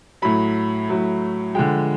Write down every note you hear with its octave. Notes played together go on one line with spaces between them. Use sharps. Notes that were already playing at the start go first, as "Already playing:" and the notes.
A2 F#3 B5
A2 F#3
D3 F3 G#3 G5